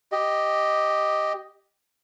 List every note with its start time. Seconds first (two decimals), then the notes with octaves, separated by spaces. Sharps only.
0.12 G4 D#5